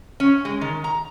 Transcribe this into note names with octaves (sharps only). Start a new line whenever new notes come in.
C#4
G#3
D#3
A#5